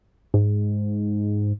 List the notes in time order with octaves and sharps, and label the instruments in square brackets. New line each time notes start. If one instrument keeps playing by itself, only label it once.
[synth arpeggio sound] G#2